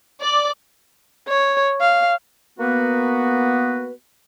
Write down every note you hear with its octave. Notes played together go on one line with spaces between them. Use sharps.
D5
C#5
F5
A#3 B3 F#4 B4